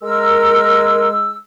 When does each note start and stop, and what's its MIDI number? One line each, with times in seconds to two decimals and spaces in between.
0.03 1.36 56
0.03 1.08 70
0.03 1.36 88